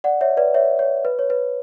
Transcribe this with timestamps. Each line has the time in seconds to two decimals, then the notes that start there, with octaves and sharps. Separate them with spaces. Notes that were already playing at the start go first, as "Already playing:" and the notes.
0.04 D5 F#5
0.21 C#5 E5
0.37 B4 D5
0.54 C#5 E5
0.79 C#5
1.05 B4
1.19 C#5
1.30 B4